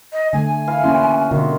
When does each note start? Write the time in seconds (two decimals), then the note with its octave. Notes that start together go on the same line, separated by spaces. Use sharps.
0.13 D#5
0.33 D3 A3 G#5
0.68 E3 F5
0.84 A#3 C#4 E4 F#4 C6
1.31 B2 D3 D#3 G#3 F4